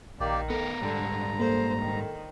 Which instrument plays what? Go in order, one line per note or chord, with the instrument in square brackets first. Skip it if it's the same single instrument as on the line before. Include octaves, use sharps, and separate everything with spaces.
[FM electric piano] A#1 [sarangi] D#3 [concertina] A#3 G4 D5
[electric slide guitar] B3 A#4 [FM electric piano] A4 [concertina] A#5
[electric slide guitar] G#2 G3 [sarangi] D3
[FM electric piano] A#3 A4 [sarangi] C5
[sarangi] D#3